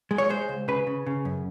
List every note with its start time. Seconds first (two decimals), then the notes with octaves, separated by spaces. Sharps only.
0.11 G#3
0.18 C#5
0.30 G#3 C5
0.49 C#2
0.68 C#3 B4
0.87 C#3
1.06 C#3
1.25 F#2